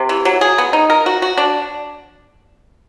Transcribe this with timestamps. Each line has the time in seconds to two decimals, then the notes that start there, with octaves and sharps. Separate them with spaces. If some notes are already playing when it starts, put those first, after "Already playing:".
Already playing: C3
0.09 E3
0.25 F#3
0.41 G#4
0.58 B3
0.73 D#4
0.90 A#4
1.06 F#4
1.22 F#4
1.37 D4